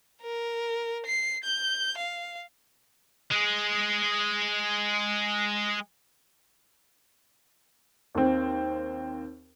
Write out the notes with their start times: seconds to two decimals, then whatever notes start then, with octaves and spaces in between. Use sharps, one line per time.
0.22 A#4
1.06 C7
1.44 G6
1.97 F5
3.32 G#3 G#4
8.15 D#2 C4